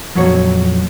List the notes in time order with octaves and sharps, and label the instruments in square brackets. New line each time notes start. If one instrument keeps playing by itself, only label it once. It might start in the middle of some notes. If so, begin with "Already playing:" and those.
[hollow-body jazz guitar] F2 A#2 F#3 F#4 C#5